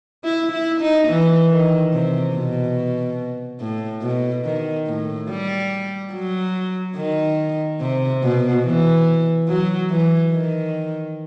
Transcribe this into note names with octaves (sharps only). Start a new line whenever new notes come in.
E4
E4
D#4
E3
D#3
C3
B2
A2
B2
D#3
A2
G3
F#3
D#3
C3
B2
E3
F#3
E3
D#3